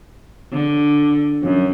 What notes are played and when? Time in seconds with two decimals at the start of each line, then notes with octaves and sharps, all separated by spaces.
0.52 D3
1.43 F#2